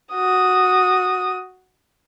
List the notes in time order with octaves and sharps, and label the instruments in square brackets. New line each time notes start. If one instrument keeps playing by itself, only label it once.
[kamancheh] F#4 D#6